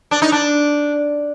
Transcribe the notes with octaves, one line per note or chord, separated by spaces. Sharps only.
D4
D#4
D4